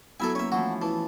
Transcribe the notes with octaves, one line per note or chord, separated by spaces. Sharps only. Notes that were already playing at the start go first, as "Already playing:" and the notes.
F#3 B3 E4 A4 E5 G#5
A#3 C#4 C#5 E5
E3 F3 A3 F#4
E3 A5